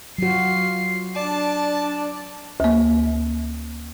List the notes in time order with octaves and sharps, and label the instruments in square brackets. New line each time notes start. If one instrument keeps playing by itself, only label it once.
[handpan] F#3 F#4 [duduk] F4 [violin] C7
[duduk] D4 [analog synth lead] D5 [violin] A5
[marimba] D2 A#3